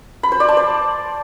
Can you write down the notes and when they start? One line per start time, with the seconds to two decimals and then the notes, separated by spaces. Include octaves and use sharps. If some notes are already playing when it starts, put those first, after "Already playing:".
0.23 B5
0.32 C5
0.40 D5
0.48 A5
0.57 C5